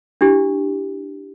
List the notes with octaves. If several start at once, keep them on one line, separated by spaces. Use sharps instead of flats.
D4 E4 G4